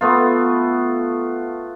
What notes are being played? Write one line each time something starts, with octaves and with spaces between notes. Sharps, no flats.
A3 B3 F4